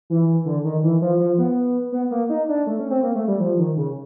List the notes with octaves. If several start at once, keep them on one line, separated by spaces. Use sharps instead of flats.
E3
D3
D#3
E3
F3
F3
B3
B3
A#3
D#4
D4
A3
C#4
C4
A#3
A3
G3
F3
D#3
C#3